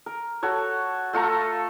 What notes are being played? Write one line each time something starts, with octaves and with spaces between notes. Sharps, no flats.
A#4
F#4 A4 C#5
A3 F4 A4 A#5